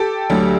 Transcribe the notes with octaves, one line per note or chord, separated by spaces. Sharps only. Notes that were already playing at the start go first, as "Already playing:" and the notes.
Already playing: G4 A4
D2 D3 F#3